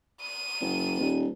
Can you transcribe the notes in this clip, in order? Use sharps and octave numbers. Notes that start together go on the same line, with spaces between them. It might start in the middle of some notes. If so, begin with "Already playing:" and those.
D#7
F#1
D#1